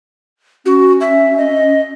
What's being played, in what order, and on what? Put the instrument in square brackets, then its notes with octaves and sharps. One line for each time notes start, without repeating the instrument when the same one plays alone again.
[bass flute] C#4 [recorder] F#4
[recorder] E5
D#5